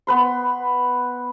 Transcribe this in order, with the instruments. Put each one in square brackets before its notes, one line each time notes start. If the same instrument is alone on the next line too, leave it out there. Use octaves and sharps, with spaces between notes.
[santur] B3 B4 C6